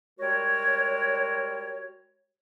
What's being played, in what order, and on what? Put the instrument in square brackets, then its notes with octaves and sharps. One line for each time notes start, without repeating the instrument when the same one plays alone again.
[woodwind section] G3 G#3 F#4 A#4 C#5